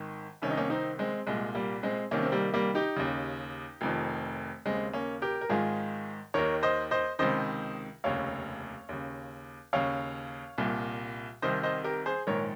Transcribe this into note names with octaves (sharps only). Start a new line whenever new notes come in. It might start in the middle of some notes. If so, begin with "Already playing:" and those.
Already playing: G#1 D#3
C2 C3 D#3 C#4
D#4
A#3 C#4
C4 D#4
G#3 C4
C2 A#2 G#3
G3 A#3
G#3 C4
C2 C3 D#3 A#3 C#4
C4
G3 A#3
G3 A#3
D#4 G4
D#2 C#3
F1 F2 D#3
D#2 C#3 G#3 C4
A#3 C#4
G4 A#4
A#4
G#1 G#2 D#3 F4 G#4
D#2 D#3 A#4 C#5
C5 D#5
C5 D#5
C#2 C3 D#3 C5 D#5
F1 D#2 C#3 C#5 F5
D#2 C#3
D#2 C#3 C#5 F5
C2 A#2
C2 C3 D#3 C5 D#5
C5 D#5
G4 A#4
G#4 C5
A#1 G#2 D#3 A#4 C#5